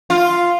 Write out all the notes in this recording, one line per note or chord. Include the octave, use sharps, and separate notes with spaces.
F4